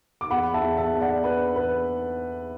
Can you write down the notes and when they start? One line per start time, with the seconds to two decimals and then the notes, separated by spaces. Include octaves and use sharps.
0.21 D6
0.30 E2 F#5 B5
0.54 E5 A5
0.61 E2
0.77 E5 A5
0.93 E2
1.00 D5 F#5
1.24 D4 B4
1.55 E2 B4